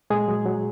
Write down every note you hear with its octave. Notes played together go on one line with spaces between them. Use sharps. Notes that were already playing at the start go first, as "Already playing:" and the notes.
A#2 G#3 G#4
F#3
F#3